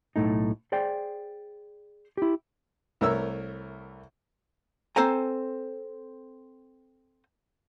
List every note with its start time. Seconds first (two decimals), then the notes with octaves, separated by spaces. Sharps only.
0.16 B1 F#2 A2 A3 D#4
0.72 G#4 C5 D5 G5
2.17 E4 G4
3.01 C2 A3 A#4 C#5 E6
4.96 C4 A4 C5 G#5 A#5